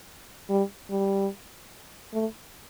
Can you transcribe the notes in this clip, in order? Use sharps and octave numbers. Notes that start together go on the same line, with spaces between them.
G3
G3
A3